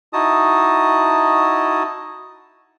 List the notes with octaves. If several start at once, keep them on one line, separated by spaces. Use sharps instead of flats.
D#4 E4 F#4 D#5 A5 D#6